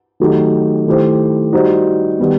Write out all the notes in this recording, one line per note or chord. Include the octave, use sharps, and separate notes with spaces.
D#3 F#3 A3 D#4 G4
D#3 A3 E4 G4 C5
G3 D#4 F#4 C5
D#3 G3 B3